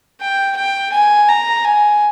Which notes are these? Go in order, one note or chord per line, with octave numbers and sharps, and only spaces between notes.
G5
G5
G#5
A#5
G#5